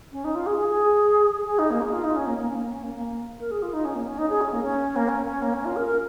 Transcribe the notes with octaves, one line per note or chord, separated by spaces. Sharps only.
C#4
D#4
F4
G#4
G#4
G#4
G#4
G#4
D#4
A#3
G#4
F4
D#4
C#4
A#3
A#3
C#4
A#3
C#4
A#3
A#3
A#4
G#4
F4
D#4
C#4
A#3
C#4
D#4
G#4
C#4
A#3
C#4
A#3
C#4
A#3
C#4
F4
A#4
A#4